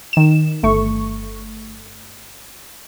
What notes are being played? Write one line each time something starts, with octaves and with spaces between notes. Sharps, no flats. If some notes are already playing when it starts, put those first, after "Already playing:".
D#3 E7
G1 A3 C#6